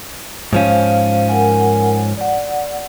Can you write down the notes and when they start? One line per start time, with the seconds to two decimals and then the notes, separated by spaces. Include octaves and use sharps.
0.53 G#2 F3 C#4 C5 F5
1.29 A#4 F#5 G#5
2.17 D5 F#5